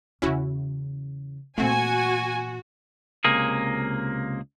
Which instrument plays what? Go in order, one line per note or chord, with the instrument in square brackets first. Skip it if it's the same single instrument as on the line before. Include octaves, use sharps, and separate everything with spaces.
[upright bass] E2 C#3 [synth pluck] C#4 E4 F#4
[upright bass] A#2 E3 [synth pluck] A3 C4 [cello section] F#4 [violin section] G#5
[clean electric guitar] C#2 C3 A#3 G#4